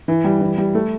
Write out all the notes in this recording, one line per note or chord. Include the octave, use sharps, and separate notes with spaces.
E3
G3
E3
G3
A3